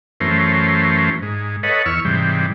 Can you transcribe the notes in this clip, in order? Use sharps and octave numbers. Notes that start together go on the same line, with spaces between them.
F#2 E3 A3 C#4 A#4 C5
G#2
A4 B4 C#5 D#5 F#5
E2 C#6 E6 F6
G#2 C3 E3 G3